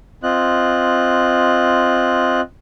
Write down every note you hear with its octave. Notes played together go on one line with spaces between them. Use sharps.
C4 F4 D#5 F#6